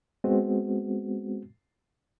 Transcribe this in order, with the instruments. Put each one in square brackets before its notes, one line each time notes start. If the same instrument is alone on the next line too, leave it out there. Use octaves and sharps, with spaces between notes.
[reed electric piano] G#3 B3 C4 F#4